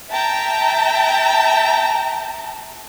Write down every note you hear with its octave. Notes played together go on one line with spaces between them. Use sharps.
E5 G5 A5 A#5